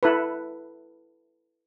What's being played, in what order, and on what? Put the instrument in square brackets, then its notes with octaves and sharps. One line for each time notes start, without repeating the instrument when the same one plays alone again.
[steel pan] E4 A4 B4